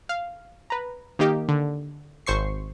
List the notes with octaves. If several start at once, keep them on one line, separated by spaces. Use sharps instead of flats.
F5
B4 A#5
D#3 A#3 D#4 G4
D3
G#1 C5 C#6 C7